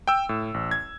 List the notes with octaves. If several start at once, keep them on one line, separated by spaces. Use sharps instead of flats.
G5 E6
A2
A1
G#6